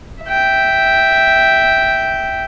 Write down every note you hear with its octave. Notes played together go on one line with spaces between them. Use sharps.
E5 G5